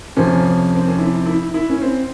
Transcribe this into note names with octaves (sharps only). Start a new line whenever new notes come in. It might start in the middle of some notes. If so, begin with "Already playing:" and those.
F2 C3 F3 C#4
C4
C#4
E4
E4
E4
C#4
C4